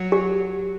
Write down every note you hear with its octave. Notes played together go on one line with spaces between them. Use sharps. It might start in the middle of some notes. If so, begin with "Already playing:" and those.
Already playing: F#3
G4